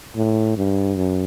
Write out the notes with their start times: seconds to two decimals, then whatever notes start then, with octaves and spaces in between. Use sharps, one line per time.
0.16 A2
0.57 G2
0.97 F#2